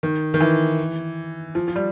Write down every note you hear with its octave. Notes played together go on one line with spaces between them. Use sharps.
D#3
D#3
E3
F3
F3
G3